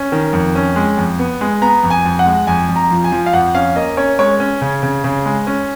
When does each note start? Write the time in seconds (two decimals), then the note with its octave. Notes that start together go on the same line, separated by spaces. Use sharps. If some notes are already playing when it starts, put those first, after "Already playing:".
Already playing: C#4
0.12 D#3
0.33 F2
0.55 C#4
0.76 G#3
0.98 F2
1.19 B3
1.41 G#3
1.62 B3 A#5
1.83 F2
1.90 G#5
2.05 F2
2.19 F#5
2.26 G#3
2.47 F2 G#5
2.69 F2
2.76 A#5
2.90 F3
3.04 G#5
3.12 F3
3.26 F5
3.33 F2 F#5
3.54 C#4 F5
3.76 A#3 D#5
3.97 C#4 C#5
4.19 G#3 C#5
4.40 C#4
4.61 C#3
4.83 C#3
5.04 C#3
5.26 G#3
5.47 C#4